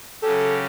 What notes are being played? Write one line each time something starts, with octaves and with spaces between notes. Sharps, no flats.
C#3 F#3 C#4 G4 A4